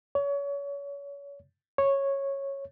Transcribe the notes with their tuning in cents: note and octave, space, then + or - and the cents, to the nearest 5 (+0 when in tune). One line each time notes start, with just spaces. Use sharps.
C#5 +30
C#5 -10